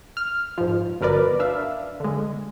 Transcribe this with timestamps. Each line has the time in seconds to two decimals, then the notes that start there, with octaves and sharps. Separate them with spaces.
0.17 F6
0.58 G#2 F3
1.01 G1 F#3 A#4 B4 D5
1.40 D4 E5 F5
2.00 D3 G#3